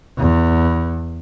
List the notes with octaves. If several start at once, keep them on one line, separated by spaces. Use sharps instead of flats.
E2